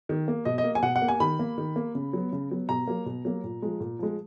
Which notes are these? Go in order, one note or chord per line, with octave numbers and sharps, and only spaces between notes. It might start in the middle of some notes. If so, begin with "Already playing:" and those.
D#3
A#3
B2 D#5
D#5
A#3
G#5
B2 F#5
F#5
A#3
G#5
D#3 B5
A#3
D#3
A#3
C#3
F#3 B3
C#3
F#3 B3
B2 A#5
F#3 A#3
B2
F#3 A#3
A#2
F3 G#3
A#2
F3 G#3